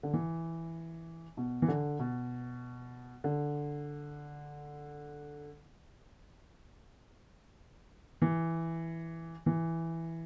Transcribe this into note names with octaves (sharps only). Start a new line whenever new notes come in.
D3
E3
B2
E3
D3
B2
D3
E3
E3